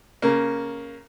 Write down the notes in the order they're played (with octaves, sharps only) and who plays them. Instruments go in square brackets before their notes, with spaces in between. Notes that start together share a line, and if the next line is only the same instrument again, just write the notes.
[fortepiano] C#3 A#3